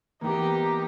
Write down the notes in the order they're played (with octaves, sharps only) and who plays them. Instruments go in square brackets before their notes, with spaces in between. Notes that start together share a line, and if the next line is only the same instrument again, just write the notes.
[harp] E3 B4 A#5 [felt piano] A#3 B3 [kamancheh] D#4 G4